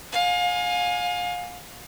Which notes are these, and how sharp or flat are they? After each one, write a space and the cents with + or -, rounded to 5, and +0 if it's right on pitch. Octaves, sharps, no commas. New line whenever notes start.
F5 +35 G#5 +0